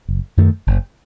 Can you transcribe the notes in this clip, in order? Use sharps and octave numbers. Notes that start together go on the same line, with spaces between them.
F#1
F#2 D#3 A3
F#1